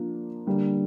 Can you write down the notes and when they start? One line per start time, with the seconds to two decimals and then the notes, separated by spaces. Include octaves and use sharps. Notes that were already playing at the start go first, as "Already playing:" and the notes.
Already playing: F3 A#3 D4 F4
0.47 D3 G3 A#3 D4